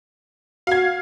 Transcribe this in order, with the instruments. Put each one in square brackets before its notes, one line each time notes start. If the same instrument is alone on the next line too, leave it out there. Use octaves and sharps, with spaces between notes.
[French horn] F#4 [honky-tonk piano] F5 G#6